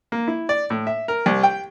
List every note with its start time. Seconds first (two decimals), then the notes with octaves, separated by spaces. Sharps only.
0.12 A#3
0.28 E4
0.49 D5
0.70 A2
0.87 E5
1.08 A#4
1.26 C2
1.43 G5